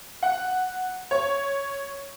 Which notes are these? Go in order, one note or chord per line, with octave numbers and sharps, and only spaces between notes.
F#5
C#5